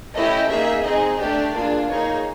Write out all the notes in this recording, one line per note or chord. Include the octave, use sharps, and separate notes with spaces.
A3 C#4 E4 G4 D#5
A#3 D#4 G#4 E5
C4 D#4 G#4 D#5
A3 D4 G4 D5
A#3 D4 F4 G#4
A#3 D#4 G#4 C#5